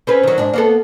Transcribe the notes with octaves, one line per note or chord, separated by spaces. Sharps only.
C4 C#4 B4
D#3 F#3
G#2 D4
A#3 B3 A4